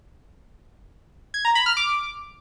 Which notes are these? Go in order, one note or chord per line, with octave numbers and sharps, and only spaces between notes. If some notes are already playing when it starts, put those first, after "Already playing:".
G#6
A#5
B5
F6
D6